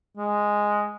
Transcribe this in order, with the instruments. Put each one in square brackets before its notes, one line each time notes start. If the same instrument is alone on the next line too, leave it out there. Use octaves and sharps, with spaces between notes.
[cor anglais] G#3